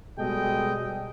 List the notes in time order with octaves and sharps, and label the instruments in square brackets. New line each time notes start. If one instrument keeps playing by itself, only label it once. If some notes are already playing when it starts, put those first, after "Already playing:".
[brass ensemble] B2 G3 G#3 A4 D#5 G5